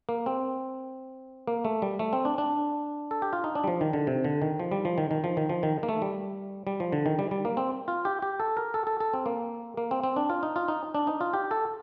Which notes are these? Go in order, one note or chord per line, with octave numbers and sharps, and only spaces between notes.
A#3
C4
A#3
A3
G3
A3
C4
D4
D4
A4
G4
F4
D#4
D4
G3
F3
D#3
D3
C3
D3
D#3
F3
G3
F3
D#3
D#3
F3
D#3
F3
D#3
A#3
A3
G3
G3
F3
D3
D#3
G3
G3
A#3
C4
F4
G4
G4
A4
A#4
A4
A4
A4
C4
A#3
A#3
C4
C4
D4
F4
D#4
F4
D#4
D4
D#4
F4
G4
A4